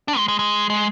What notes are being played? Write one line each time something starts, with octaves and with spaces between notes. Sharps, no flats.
D4
G#3
G#3
G#3
G#3